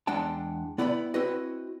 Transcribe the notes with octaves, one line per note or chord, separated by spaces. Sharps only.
E2 G#3 D4 F#5 G5 A5
B3 E4 D5 G5 G#5 B5
C4 E4 F#4 B4 D#5